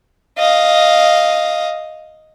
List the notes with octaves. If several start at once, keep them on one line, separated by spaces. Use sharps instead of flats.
D#5 F5